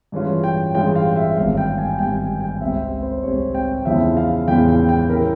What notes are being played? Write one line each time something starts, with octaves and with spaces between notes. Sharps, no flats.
G2 E3 G#3 C#4 F4
G5
G2 E3 G#3 C#4 F4 G5
F5
E5
G#1 G2 G3 F5
G5
G#5
G#1 G2 G3 G5
G#5
G5
C#2 C3 G3 C4 E5
C5
C#2 C3 G3 C4 C#5
G5
E2 C#3 F3 G#3 E4 E5
F5
E2 C#3 F3 G#3 E4 G5
G5
G5
G3 C#4 E4 A#4